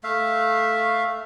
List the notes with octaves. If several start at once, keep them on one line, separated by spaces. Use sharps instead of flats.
A3 E5 F5